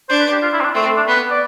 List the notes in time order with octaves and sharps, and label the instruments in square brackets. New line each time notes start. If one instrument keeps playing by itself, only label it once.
[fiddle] D4 [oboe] C5
[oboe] B4
G4
F4
E4
C4
D4
[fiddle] A3 [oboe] C4
[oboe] C4
D4
[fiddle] B3 [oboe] B4
[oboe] D5